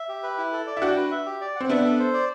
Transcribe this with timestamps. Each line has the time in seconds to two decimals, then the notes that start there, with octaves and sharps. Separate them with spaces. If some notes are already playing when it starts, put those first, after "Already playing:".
Already playing: E5
0.09 G4
0.23 B4
0.38 E4
0.53 A4
0.67 D5
0.77 E4
0.82 D4 F#4 G5
0.97 B4
1.11 E5
1.26 G4
1.41 D5
1.56 C4 F#5
1.69 B3 D4 E5
1.84 A4
1.99 C5
2.14 D5